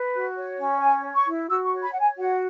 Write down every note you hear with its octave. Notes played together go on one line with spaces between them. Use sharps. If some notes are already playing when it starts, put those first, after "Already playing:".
Already playing: B4
F#4
C#5
C#4
C#5 G#5
C#5
C#6
E4
F#4 E6
C#6
C#5
B5
C#5 F#5
G#5
F#4 F#5